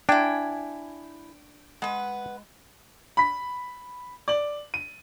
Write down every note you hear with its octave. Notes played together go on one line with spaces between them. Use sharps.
D4 E4 G5 G#5
G#3 B4 F#5
B5 B6
D5 F#7
D#7